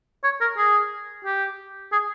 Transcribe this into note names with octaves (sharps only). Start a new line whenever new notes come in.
C#5
A#4
G#4
G4
G#4